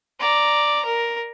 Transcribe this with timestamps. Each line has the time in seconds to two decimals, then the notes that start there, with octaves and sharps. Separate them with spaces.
0.20 D5 A#5
0.85 A#4